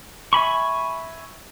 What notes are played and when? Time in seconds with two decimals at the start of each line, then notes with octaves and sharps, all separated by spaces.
0.33 E5 G#5 B5 C#6